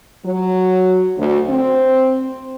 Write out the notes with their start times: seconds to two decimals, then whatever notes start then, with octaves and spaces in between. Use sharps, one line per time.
0.25 F#3
1.16 D2
1.49 C4